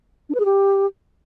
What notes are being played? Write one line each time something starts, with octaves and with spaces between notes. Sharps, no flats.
D4
B4
G#4
G4